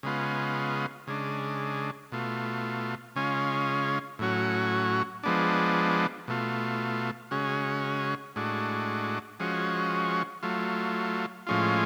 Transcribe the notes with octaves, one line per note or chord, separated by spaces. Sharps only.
C#3 G#3 B3 F4
C#3 G#3 D4
B2 A3 F4
C#3 G#3 C#4 F4
A2 F#3 C#4 F#4
F3 G#3 B3 D4
B2 A3 F4
C#3 G#3 C#4 F#4
A2 G#3 D4 F#4
F3 G#3 C#4 F#4
F#3 A3 F4
A2 F3 G#3 C#4 F4